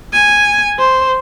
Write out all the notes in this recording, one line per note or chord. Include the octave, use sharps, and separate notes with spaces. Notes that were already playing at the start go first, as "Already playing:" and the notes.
G#5
C5